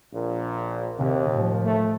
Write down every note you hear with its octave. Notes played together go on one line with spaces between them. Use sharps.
A#1 A#2
D#2 C3
A2 F3
A3